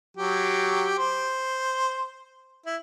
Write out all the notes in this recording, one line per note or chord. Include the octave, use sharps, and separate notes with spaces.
F#3 G4
C5
E4